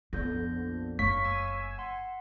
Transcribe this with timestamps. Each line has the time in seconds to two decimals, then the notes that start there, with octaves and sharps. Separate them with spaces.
0.13 A#1 F2 D3 B3 G6 A#6
0.99 F#1 C#5 F5 C#6 B6
1.24 G#5 E6
1.78 F#5 C6